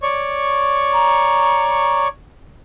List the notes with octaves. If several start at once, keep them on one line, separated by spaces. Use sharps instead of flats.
C#5 D5 C#6
A#5